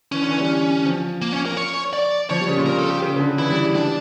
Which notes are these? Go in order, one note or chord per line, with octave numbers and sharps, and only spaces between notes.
E3 C#4
D3
E3
G3
F3
A#3
C#4
A#4
C#5
D5
F3 C#5
G3
C#3
A#2
A#4
A4
G4
C#3
C#3
D3
E3 E4
G3
G3 D4